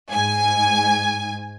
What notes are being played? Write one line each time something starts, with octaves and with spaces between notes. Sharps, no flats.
G#2 G#5